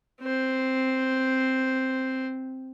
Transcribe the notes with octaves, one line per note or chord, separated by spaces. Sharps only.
C4 C5